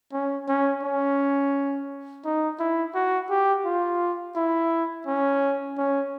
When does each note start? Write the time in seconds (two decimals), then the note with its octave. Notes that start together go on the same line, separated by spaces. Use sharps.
0.13 C#4
0.48 C#4
0.83 C#4
2.25 D#4
2.60 E4
2.95 F#4
3.30 G4
3.65 F4
4.36 E4
5.07 C#4
5.77 C#4